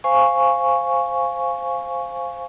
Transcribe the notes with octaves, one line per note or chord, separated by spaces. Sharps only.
C5 F5 G#5 C#6